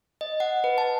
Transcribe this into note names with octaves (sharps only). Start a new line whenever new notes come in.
D#5
F#5
B4
A5